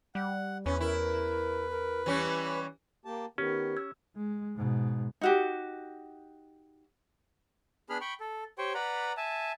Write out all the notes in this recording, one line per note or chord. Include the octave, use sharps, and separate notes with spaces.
G3 F#5
E2 C#4 B4
E4 A#4
A#4
E3 G3 C#4 C#5
A#3 G4 A5
D#3 B3 C#4 G4
E6 G#6
G#3
G#2 B2
D#4 F#4 G4
B3 D4 G#4 B5 F6
G5 B5 C#6
A4
G4 C5 C#5 G5 C#6
B4 D5 F#5 A#5 B5
E5 G#5 A5